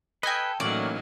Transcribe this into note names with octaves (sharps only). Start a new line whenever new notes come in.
A4 B4 D#5 G5 G#5
A2 E3 F#3 A#3 C#4 D#4 D5 C#6